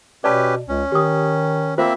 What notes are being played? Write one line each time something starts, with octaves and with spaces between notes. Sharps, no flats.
B2 C#4 G4 B4 D5 A5
C#2 C#4
D#3 G4 D#6
A#3 C4 F4 C5 E5